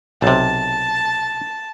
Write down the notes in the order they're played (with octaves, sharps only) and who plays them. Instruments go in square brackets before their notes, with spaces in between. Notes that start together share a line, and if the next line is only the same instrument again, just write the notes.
[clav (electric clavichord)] B1 C3 [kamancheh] A5